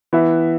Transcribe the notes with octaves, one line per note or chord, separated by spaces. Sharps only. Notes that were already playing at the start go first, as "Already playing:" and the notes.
E3 B3 E4 B4 E5